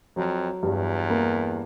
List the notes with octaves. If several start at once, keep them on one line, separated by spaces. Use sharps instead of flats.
F2 F#3
E2 G2
A#3